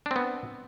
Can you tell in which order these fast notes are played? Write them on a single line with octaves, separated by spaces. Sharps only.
D4 C4 B3